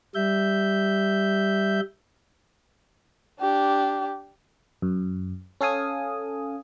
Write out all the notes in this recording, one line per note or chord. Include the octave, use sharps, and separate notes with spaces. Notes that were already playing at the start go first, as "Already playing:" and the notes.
G3 E5 G6
D4 G4
F#2
C#4 A4 F5 G#5 D#6